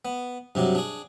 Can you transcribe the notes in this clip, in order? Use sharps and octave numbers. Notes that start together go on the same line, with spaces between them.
B3
G2 C3 F#3
D4 G#4